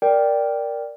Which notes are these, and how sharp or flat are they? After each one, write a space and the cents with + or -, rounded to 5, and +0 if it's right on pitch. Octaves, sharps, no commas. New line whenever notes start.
A#4 +0 D5 +0 G5 +0